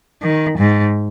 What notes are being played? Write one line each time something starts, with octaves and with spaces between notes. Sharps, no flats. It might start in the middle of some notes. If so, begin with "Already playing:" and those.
D#3
G#2